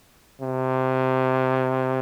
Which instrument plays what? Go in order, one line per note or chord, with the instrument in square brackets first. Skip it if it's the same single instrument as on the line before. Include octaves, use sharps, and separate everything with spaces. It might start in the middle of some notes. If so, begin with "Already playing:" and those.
[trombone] C3